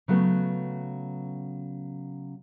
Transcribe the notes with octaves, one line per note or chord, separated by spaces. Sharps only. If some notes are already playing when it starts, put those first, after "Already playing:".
C#3 F#3 A3 B3